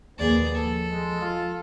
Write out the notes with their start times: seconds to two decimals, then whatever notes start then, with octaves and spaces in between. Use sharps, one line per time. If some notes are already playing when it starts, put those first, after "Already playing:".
0.19 A#1 D#2 A#3 B3 G#4 D5
0.56 F3 A4
0.90 G#3
1.21 F4